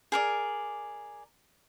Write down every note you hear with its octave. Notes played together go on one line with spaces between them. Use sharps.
G#4 A#4 D5